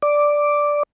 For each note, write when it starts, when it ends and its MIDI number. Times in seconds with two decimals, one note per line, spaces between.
0.02 0.83 74
0.02 0.83 86